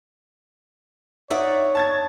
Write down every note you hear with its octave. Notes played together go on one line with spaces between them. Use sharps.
D#4 C#5 D5 E5 F#5
A5 G#6 A6